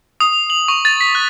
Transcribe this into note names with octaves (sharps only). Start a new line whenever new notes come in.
D#6
F#7
C#6
A6
B6
F#6